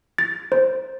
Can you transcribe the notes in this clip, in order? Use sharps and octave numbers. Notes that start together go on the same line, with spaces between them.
A6
C5